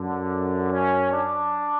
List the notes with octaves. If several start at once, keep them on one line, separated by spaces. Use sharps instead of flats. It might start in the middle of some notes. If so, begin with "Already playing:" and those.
Already playing: F#2 D3
C#4
D4